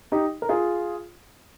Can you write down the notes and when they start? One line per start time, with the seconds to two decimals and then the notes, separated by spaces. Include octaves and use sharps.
0.12 D#4 G4
0.42 A#4
0.49 F4 G#4